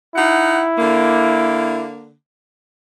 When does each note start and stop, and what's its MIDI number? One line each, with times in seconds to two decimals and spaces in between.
0.15 0.63 63
0.15 1.86 64
0.15 0.63 78
0.78 2.13 50
0.78 2.13 58